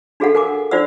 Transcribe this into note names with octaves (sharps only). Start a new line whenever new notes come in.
D4 F#4 G#4 A4 F5 F#5
A#4 G#5 D6
D4 F4 C5 D5 F#5 E6